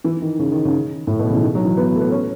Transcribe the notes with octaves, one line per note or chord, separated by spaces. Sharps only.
E3
D#3
C#3
D#3
C#3
A2
B2
C#3
E3
D#3
F#3
E3
B3
A3
B3
C#4